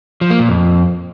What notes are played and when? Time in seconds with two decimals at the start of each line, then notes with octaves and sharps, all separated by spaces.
0.21 F3
0.30 A#3
0.40 A#2
0.49 F2